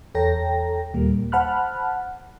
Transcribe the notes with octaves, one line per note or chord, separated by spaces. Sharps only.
E2 A4 C#5 G5 A#5 A#6
D#2 A#2 G3 A#3
C5 F#5 A5 B5 F6 F#6